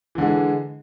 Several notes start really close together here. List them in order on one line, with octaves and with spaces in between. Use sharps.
E3 D3 G#3